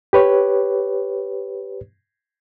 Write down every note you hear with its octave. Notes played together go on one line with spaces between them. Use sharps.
G4 B4 C#5